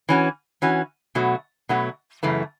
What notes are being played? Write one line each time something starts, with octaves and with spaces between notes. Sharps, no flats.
E3 C#4 F#4
E3 C#4 F#4
B2 F#3 A3 F#4
B2 F#3 A3 F#4
F#2 C#3 E3 A3